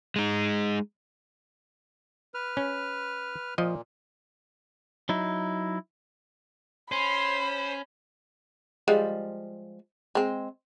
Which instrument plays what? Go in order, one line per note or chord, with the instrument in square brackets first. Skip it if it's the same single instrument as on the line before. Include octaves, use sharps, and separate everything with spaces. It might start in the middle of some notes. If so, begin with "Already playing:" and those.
[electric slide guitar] G#3 D#4
[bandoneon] B4 F6
[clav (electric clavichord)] C#4
[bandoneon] A#2 [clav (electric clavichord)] F3 D#5
[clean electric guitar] F#3 D#4 E4
[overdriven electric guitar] C#4 [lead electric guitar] C5 [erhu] B5 [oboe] C6
[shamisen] F3 G3 G#3
G#3 C4